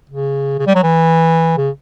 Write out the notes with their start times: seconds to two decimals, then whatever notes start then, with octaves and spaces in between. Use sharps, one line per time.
0.10 C#3
0.59 C#3
0.67 G3
0.75 F#3
0.83 E3
1.57 C#3